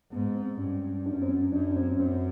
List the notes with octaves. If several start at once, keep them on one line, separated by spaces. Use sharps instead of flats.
G#2 B3
C4
G2 C#4
F#2 D4
C#4
C4
C#4
F#2 D4
C#4
C4
C#4
F#2 C4